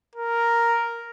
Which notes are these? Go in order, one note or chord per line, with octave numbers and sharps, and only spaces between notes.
A#4